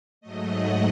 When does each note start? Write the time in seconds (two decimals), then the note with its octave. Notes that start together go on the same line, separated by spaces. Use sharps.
0.21 G#2 F#3 A3 D#5
0.50 F#5